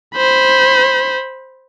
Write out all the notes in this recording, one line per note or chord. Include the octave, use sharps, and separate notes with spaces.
C5 B5